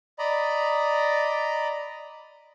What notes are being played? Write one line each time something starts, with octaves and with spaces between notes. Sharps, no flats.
D5 D#5 A#5 B5